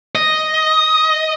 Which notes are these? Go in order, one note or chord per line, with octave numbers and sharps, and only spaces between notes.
D#5